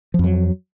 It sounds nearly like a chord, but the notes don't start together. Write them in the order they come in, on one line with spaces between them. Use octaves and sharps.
F3 F2 F#3